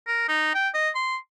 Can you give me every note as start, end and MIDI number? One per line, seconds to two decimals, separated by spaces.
0.07 0.24 70
0.28 0.50 63
0.54 0.69 79
0.74 0.89 75
0.95 1.16 84